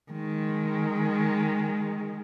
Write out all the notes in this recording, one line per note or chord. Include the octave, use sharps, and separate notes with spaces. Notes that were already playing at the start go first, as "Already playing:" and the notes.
D#3 G#3